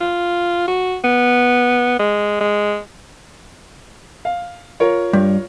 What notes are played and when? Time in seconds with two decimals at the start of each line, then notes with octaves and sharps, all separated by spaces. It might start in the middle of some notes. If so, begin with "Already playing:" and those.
0.01 F4
0.68 F#4
1.04 B3
1.99 G#3
2.41 G#3
4.25 F5
4.80 F4 A#4 C#5
5.13 G2